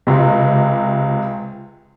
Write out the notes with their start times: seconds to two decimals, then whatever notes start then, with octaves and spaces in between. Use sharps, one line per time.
0.07 C#2 C3